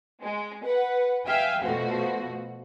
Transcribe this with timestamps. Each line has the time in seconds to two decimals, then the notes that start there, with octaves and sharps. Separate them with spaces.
0.21 G#3
0.64 B4 F#5
1.25 E5 F5 G5 G#5
1.63 B2 F3 A3 F#4